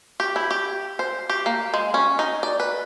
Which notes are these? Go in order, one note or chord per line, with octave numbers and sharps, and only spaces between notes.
G4
E4
G4
C5
G4
A#3
G#3
C#4
D#4
D5
B4